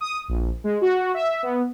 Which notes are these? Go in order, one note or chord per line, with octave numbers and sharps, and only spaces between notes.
D#6
A#1
G#3
F#4
E5
B3